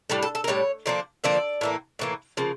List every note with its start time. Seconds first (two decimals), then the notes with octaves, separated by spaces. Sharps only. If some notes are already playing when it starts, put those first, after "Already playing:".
0.10 A2 G3 D4 A4
0.23 A4
0.35 A4
0.44 A#4
0.48 A2 G3 D4 C#5
0.86 D3 F3 A#3 D4
1.24 D3 F3 A#3 D4 D5
1.61 A2 E3 A#3
1.99 A2 E3 A#3
2.37 C#3 F3 A#3